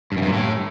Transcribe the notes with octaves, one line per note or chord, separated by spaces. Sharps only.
G2
F#2
G2
A#2
A2